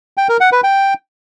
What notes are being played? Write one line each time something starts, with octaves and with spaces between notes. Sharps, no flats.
G5
A#4
F#5
B4
G5